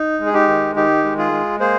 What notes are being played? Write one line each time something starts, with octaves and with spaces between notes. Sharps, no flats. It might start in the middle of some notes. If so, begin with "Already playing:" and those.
Already playing: D#4
G#3
G#4
D#4 G4
D#3
D#3 D#4 G4
G#3
F4 G#4
G#3
A#3 G#4 C5